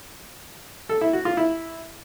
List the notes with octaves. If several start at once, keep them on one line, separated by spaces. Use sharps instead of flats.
A4
E4
F#4
F4
E4